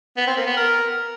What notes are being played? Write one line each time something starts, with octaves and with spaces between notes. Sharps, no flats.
B3
C4
A#3
B3
A#4